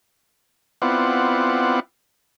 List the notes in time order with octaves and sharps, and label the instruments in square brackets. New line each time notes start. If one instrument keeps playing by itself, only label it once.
[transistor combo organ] B3 C4 E4 F4 D5 F#5